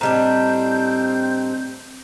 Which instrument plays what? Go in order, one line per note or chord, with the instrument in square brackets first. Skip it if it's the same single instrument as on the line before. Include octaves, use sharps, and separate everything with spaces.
[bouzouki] A2 G3 D4 [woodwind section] C4 [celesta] D#5 A#5 [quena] G6